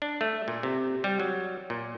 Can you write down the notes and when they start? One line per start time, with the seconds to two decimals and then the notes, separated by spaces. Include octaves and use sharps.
0.02 D4
0.21 A3
0.48 A#2
0.63 C3
1.04 G3
1.20 F#3
1.70 A#2